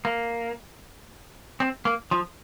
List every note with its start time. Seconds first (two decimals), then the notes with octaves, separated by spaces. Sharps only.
0.05 A#3
1.60 C4
1.85 A#3
2.11 F3